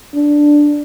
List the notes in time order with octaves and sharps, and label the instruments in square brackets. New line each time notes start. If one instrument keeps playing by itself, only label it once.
[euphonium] D4